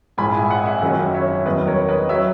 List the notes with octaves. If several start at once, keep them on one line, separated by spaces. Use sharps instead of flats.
A#1 G#2 E3 G#5 B5
E5 G#5
D#5 F#5
E5 G#5
F#1 F#2 D#3 F#3 E5 G#5
C#5 E5
E2 D#3 F#3 B4 D#5
A#4 C#5
B4 D#5
F#3 C#5 E5